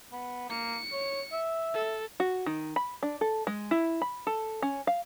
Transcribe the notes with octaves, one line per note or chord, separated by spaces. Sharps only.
B3
A#3 C#7
C#5
E5
A4
F#4
D#3
B5
D4
A4
G#3
E4
B5
A4
C#4
F5